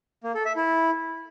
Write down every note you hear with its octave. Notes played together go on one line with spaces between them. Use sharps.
A#3
A4
E5
E4